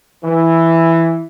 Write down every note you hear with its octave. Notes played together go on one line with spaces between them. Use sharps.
E3